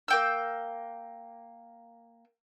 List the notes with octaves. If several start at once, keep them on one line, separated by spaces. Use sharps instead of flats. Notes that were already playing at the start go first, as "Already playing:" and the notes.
A#3 G5 E6